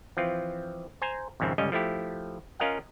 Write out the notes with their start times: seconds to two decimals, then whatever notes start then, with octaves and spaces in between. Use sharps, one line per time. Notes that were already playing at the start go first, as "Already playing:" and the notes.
0.17 E3 F3 C4 F4
1.02 C5 G#5 A#5
1.40 G#1 F2 G#2 C#3 C4 E5
1.58 G1 C#2 G3 C#4 D#5
1.72 F3 A3 E4 G4
2.60 C#4 F4 A#4 D#5 F5 F#5